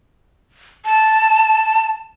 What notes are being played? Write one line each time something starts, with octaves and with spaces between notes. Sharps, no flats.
A5